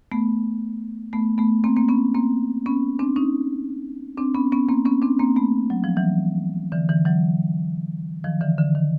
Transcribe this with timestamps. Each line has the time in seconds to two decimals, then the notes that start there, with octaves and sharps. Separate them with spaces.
0.12 A3 B3
1.13 A3 B3
1.38 A3 B3
1.64 A#3 C4
1.77 A#3 C4
1.89 B3 C#4
2.14 A#3 C4
2.66 B3 C#4
2.99 C4 D4
3.16 C#4 D#4
4.17 C4 D4
4.35 B3 C#4
4.52 B3 C#4
4.69 A#3 C4
4.85 B3 C#4
5.02 C4 D4
5.19 A#3 C4
5.36 A3 B3
5.70 F#3
5.84 F3
5.97 E3 F#3
6.72 D3 E3
6.89 D3 E3
7.05 E3 F#3
8.24 D#3 F3
8.41 D3 E3
8.58 D3
8.75 D#3